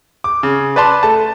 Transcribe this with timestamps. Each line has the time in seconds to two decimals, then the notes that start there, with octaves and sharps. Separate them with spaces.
0.24 D6
0.43 C#3
0.76 B4 D5 A5 C6
1.03 A3 A5